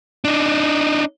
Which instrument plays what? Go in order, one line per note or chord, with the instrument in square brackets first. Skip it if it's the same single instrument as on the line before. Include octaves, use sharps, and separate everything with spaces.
[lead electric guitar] D4 D#4